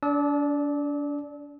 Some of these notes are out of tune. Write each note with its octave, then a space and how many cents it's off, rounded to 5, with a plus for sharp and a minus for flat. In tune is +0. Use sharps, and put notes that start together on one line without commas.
D4 -35 D5 +0 E6 -40